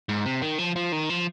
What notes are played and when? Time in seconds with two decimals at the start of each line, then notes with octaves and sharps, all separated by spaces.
0.09 G#2
0.26 C3
0.42 D#3
0.58 F3
0.76 F3
0.92 D#3
1.10 F3